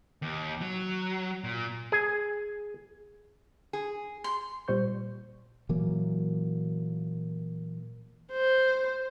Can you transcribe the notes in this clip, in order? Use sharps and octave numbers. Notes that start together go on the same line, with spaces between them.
D#2
F#3
A#2
G#4
G#4
C6
A#2 G3 C5 C#6 G6
A#2 E3 F#3 A#3
C5